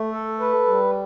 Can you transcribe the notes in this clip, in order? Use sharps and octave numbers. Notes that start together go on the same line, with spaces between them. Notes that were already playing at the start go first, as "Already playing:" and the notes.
Already playing: A3
A4
B4
G3